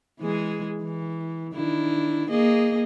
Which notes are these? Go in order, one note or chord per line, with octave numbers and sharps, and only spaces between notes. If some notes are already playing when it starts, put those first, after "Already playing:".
E3 G#3 G#4
E3
D#3 D4 E4
A#3 G#4 D#5